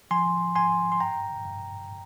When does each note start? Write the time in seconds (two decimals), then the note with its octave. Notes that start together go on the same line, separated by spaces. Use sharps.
0.11 F3 G#5 C6
0.55 G#2 G#5 C6
0.92 C6
1.00 G2 G5 A#5
1.45 G2